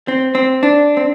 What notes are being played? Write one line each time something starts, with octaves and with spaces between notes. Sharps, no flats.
C4
C4
D4
C4